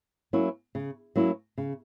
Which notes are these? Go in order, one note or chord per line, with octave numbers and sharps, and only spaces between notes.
F#3 A#3 C#4 E4
C#3
F#3 A#3 C#4 E4
C#3